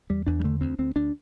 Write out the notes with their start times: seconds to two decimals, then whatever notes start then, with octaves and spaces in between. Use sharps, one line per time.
0.10 E2 G3
0.27 E2 D4
0.40 G3
0.44 D3 A3
0.61 D2 C4
0.79 D2 C4
0.96 D2 D4